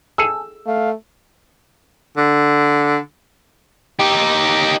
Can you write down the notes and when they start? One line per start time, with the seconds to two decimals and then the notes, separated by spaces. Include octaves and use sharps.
0.18 G#4 A4 G#5 E6
0.66 A3 F5
2.17 D3
3.99 D#4 G4